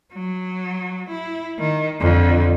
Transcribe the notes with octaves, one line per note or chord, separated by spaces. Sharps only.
F#3
E4
D#3
F2 D3